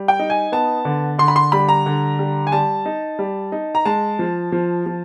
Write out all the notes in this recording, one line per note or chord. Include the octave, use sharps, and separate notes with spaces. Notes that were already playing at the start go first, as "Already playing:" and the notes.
Already playing: G3
G5
D#4
G#5
B3 A5
D3
D3 C6
B5
C6
G3 B5
A#5
D3
G3
G#5
G3 A5
D#4
G3
D#4
A#5
G#3 A5
F3
F3
F3